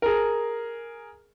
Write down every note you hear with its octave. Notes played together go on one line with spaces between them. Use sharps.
G#4 A#4